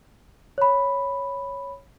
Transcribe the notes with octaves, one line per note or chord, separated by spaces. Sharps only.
C#5 B5